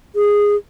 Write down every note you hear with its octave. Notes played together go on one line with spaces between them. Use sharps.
G#4